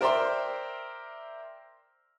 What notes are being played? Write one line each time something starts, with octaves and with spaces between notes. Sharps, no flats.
A#4 C5 D5 E5 G5 C6